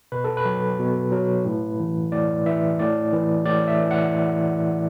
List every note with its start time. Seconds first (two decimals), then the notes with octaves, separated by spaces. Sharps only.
0.12 B2 B4
0.24 A4
0.37 B4
0.45 F#3
0.79 B2
1.12 F#3
1.45 A2
1.80 E3
2.12 A2 D5
2.46 E3 E5
2.79 A2 D5
3.13 E3
3.45 A2 D5
3.68 E5
3.80 E3
3.91 F#5